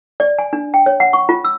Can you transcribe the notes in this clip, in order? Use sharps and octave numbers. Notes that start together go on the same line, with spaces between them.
D5
G#5
D4
G5
C#5
F#5
C#6
F4
E6